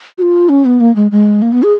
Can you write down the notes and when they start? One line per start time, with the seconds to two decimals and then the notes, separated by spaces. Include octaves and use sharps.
0.18 F#4
0.22 F4
0.49 C#4
0.65 B3
0.80 A#3
0.96 G#3
1.11 G#3
1.42 A#3
1.52 B3
1.63 G#4